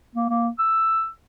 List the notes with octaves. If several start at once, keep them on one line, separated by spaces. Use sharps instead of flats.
A#3
A#3
E6